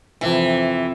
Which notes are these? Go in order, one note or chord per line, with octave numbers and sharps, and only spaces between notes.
F2 C3 E3 F3